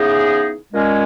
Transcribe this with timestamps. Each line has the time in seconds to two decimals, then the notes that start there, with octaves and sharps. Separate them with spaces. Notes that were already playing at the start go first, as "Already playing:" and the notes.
Already playing: C#3 E3 B3 D#4 G#4
0.73 A#2 G#3 C#4